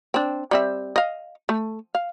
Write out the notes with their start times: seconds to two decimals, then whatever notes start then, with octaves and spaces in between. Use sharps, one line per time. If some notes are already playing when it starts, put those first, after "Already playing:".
0.14 C4 D4
0.51 G3 C4 E5
0.96 D#5 F5
1.49 A3
1.95 F5